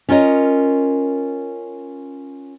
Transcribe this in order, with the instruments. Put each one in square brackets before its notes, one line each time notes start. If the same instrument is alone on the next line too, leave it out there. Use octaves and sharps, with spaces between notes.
[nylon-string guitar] C#4 F4 A#4 C#5 D#5